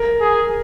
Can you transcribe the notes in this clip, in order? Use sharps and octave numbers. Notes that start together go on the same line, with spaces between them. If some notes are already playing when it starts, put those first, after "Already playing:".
Already playing: A#4
G#4